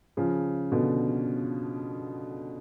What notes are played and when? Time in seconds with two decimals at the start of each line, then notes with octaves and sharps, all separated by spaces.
0.17 C#3 F3
0.72 B2 D3